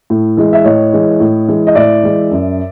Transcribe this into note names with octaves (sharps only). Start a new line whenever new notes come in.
A2
E3 G#3
E5
A2 C#5 D#5
E3 G#3
A2
E3 G#3
D#5
A2 D5 E5
E3 G#3
F#2